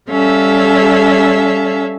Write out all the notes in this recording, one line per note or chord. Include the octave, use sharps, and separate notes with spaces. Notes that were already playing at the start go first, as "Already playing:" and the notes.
G3 C#4 A4 E5 F5